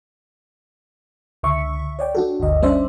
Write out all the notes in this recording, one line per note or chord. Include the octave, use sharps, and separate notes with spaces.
C#2 D3 E5 C#6
C#5 D5 G5
D4 F#4 A4
G1 D2 D#5
G3 C#4 D4 C5 D5 E5